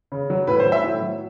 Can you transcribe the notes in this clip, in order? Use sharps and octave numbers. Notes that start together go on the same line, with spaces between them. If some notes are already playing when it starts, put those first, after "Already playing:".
C#3
F#3
A2 B4
C5
F#3
E5
A2
F#3